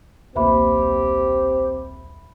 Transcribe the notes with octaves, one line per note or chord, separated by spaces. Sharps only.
D#1 B1 A#3 C4 G4 B4 E5 B5